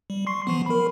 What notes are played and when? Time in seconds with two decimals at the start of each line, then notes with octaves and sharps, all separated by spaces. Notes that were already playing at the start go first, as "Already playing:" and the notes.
0.10 G3
0.27 C6 C#6 C7
0.47 E3 F3 B3
0.66 A#4 B5